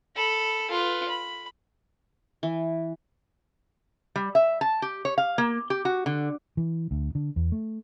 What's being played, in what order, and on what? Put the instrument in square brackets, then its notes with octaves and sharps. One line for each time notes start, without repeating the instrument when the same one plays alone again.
[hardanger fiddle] A4 B5
F4 B4
B5
[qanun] E3
[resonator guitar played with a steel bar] G3
E5
A5
G4
C#5
F5
A#3
G4
F#4
D3
[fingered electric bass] E3
D2
D3
E2
A3